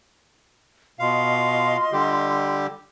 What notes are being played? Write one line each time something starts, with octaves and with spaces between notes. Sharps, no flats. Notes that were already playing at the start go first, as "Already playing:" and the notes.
B2 F4 D#5 F5 C6
D3 G3 G4